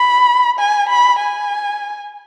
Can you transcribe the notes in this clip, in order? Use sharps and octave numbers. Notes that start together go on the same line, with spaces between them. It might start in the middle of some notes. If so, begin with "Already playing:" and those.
Already playing: B5
G#5
B5
G#5